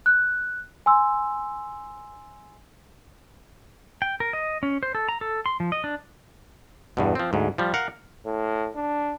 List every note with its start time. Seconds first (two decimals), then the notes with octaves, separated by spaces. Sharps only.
0.06 F#6
0.86 G#5 C6 E6
4.02 G5
4.20 A#4
4.33 D#5
4.63 C#4
4.83 C5
4.95 A4
5.09 A#5
5.21 A4
5.46 C6
5.60 F3
5.72 D#5
5.84 D4
6.97 E2 G2 B2
7.15 F3 C4
7.33 D2 G#2
7.58 F3 G3
7.74 A#4 F5 F#5
8.25 A2
8.76 D4